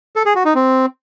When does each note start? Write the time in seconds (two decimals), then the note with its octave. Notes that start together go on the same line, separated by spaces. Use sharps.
0.16 A4
0.26 G#4
0.35 F#4
0.45 D#4
0.55 C4